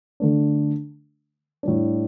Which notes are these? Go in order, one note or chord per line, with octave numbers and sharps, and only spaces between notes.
D3 A3 D4
A2 G3 D4